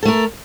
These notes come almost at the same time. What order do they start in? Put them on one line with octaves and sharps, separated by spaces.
A4 A3 A#4